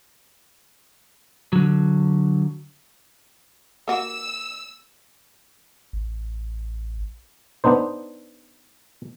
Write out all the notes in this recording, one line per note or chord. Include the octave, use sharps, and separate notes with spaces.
D3 F#3
A#3 F#4 E6
A1
B3 D4 D#4 C5